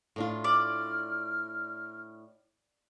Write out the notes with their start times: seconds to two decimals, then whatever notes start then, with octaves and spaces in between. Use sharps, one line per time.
0.16 A2 D4 F4
0.44 D5 F6